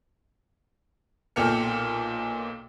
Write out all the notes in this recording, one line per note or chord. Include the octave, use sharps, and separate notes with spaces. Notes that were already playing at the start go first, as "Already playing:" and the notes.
B1 A#2 A4 G5 F6 C#7